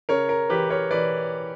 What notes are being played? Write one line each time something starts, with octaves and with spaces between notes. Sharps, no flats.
C#3 A#4 C#5
A#4
E3 G4 B4
A#4 C#5
E3 B4 D5